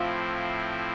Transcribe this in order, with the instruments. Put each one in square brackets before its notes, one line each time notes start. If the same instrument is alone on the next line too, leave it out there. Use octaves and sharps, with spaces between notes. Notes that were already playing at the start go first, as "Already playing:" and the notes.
Already playing: [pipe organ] A2 F3 C4 E4 [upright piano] F4